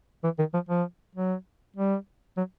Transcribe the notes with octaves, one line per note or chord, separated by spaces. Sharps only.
E3
D#3
F3
F3
F#3
G3
F#3